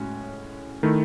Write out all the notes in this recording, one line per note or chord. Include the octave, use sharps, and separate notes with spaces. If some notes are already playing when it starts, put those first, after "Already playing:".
Already playing: A2 G#3 C#4 F#4
D#3 A3 E4